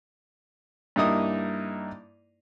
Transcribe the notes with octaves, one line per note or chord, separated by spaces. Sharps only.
G2 A#3 D#4 E4 D#6